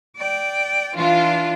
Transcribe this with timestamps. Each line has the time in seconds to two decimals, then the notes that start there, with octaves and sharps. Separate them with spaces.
0.16 D5 G5
0.96 E3 D4 F4